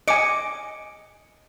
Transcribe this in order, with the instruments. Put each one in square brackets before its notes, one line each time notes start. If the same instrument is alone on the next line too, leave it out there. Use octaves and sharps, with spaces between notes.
[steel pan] D#5 G#5 [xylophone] D6 C#7 D7